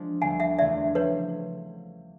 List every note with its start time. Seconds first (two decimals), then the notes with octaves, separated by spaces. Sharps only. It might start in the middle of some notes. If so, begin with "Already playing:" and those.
Already playing: F3 G#3 D4
0.22 D2 D3 G3 B3 F#5 G#5
0.40 E5 F#5
0.59 E2 C#3 F3 A3 D4 D5 E5
0.95 F3 A3 C#4 B4 C#5